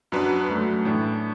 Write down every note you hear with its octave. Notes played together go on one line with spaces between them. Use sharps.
F#2 F#3 D4 B4
F#2 F#3 A3
A2 E3 D4